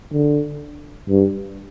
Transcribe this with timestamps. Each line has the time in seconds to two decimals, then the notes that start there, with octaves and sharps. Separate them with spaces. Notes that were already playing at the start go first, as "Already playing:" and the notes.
0.12 D3
1.09 G2